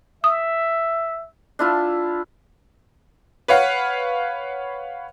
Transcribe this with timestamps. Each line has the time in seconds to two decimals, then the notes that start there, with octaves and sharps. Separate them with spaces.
0.24 E5 D#6
1.59 D4 E4 F4
3.48 B4 C#5 F5 F#5